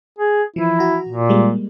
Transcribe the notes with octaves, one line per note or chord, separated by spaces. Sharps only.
G#4
E3 F3 E4
F#4 A#5
A#2
G3 G#3 A#3